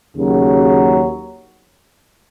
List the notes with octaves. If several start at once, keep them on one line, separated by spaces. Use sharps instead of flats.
D#2 C#3 F#3